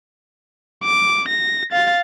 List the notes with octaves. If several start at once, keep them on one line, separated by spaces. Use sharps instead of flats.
D6
A#6
F5 A6